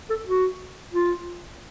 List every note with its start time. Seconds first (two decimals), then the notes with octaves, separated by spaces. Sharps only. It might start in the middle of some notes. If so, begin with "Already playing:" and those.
0.10 A4
0.26 F#4
0.93 F4